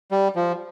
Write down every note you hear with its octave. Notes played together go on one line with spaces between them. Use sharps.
G3
F3